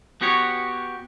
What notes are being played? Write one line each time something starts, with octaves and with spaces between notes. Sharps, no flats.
B3 F#4 G4 C#5